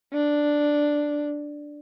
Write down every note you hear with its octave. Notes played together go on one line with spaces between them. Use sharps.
D4